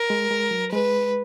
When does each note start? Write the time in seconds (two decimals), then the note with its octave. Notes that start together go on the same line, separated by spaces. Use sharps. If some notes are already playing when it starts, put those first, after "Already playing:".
Already playing: A#4
0.10 G#3
0.31 G#3
0.51 F#3
0.72 G#3 B4